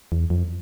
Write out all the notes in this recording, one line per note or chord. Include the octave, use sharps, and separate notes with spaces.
E2
F2